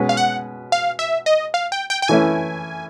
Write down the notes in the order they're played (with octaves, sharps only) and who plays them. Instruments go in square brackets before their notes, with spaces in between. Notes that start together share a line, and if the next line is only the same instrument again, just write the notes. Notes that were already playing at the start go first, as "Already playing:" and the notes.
Already playing: [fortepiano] B2 G#3 C#4 F#4 B4
[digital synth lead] F5
F#5
F5
E5
D#5
F5
G5
G5
G5
[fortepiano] E3 A3 C#4 E4 [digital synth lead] G#5